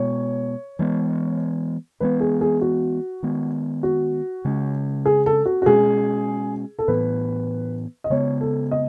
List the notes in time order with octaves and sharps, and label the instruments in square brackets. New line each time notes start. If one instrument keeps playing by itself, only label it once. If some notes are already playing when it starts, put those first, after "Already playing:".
Already playing: [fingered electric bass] B2 G#3 B3 [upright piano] C#5
[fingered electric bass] E3 G#3 B3
[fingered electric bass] E3 G#3 B3 [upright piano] B4
[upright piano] G#4
G#4
F#4
[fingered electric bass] D#3 G#3 B3
[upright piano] F#4
[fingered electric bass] C#3 G#3 C#4
[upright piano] G#4
A4
F#4
F#4
[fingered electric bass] B2 G#3 C#4 [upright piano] G#4
[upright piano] A4
[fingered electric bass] A2 E3 B3 [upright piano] B4
[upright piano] D#5
[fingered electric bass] C#3 G#3 B3 [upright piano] C#5
[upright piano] A4
D#5